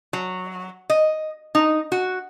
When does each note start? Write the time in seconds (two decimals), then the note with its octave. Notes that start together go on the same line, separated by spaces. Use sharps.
0.13 F#3
0.90 D#5
1.55 D#4
1.92 F#4